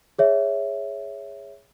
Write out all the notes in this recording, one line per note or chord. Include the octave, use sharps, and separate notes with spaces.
G#4 C#5 E5